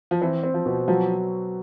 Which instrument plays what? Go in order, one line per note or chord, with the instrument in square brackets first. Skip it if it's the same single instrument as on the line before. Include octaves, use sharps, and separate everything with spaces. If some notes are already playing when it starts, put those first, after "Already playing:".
[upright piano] F3
[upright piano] E3 [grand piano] C4
[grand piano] C4
[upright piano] F3
[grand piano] B2
[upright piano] F3 [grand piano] F#3